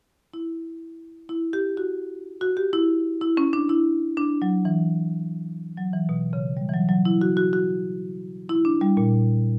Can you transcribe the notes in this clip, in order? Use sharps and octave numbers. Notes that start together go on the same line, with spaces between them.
E4
E4
G4
F#4
F#4
G4
E4
E4
C#4
D4
E4
D4
F#3
E3
F#3
E3
B2
C#3
G3
E3
F#3
F#3
E4
F#4
F#4
F#4
E4
D4
G3
A#2